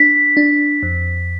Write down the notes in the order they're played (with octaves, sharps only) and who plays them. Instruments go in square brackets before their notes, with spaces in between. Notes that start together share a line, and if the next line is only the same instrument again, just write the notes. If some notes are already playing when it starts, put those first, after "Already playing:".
Already playing: [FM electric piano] D4 [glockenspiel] B6
[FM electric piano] D4
F2